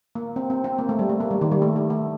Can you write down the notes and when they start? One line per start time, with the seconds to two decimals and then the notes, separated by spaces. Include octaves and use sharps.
0.15 A#3
0.36 C4
0.50 C4
0.64 C4
0.78 A#3
0.89 A3
0.99 G3
1.10 A3
1.20 A#3
1.31 G3
1.41 D#3
1.52 G3
1.62 A3
1.76 A3
1.90 A3